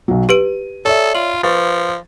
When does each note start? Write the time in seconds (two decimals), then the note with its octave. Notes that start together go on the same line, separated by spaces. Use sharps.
0.08 B1 F#3
0.29 G4 B4 D7 D#7
0.85 A4 C#5 D5 E5
1.15 F4 F#7
1.43 F3 B4 C#6 A6